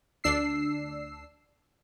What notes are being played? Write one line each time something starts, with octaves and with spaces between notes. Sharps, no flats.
D2 D4 E6 C7